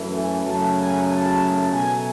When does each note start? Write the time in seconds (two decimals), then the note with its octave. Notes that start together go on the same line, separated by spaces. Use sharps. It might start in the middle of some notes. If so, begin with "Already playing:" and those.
Already playing: F#2 E3 A3
0.14 G#5
0.45 F#2 C#3 F#3 A3 A5
0.78 G#5
1.09 A5
1.72 B2 F#3 A3 G#5